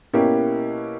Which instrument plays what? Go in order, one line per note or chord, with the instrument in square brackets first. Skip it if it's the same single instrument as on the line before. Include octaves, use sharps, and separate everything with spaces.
[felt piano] B2 A#3 C#4 E4 G4